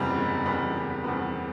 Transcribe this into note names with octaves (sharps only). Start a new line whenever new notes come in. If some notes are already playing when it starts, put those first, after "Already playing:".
Already playing: F#1 E2 C3 G3 B3
F#1
E2 C3 G3 B3
F#1
E2 C3 G3 B3